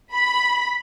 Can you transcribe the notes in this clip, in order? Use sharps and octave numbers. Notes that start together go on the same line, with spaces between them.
B5